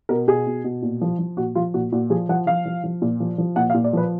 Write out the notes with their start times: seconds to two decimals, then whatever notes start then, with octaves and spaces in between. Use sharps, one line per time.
0.09 B2 A#4
0.28 B2 G#4
0.47 B2
0.64 B2
0.82 A#2
1.01 F3
1.19 F3
1.37 A#2 F#4
1.55 F3 F4
1.74 A#2 F#4
1.92 A#2 F#4
2.10 F3 G#4
2.29 F3 F#5
2.47 F3 F5
2.66 F3
2.84 F3
3.02 A#2
3.20 F3
3.38 F3
3.56 A#2 F#5
3.70 F5
3.74 A#2
3.84 D5
3.93 F3 B4